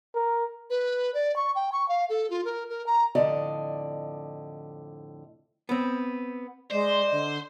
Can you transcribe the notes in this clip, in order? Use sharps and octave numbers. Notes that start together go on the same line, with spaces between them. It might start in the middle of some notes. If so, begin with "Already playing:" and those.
A#4
B4
D5
C#6
G5
C#6
F5
A4
F4
A#4
A#4
A#5
F2 A2 D3 D5 D#5
B3 C4
G#3 C5 D5 D#5
D3